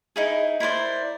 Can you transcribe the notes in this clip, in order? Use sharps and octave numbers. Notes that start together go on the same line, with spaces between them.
D#4 E4 G#4
E4 A#4 C5 D5